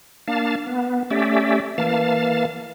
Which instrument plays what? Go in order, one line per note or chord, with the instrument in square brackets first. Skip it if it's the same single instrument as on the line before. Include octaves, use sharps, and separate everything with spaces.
[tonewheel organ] A#3 D4 F5 A5
B3
A3 C#4 G4 D5 E5
E3 A#3 F5 A5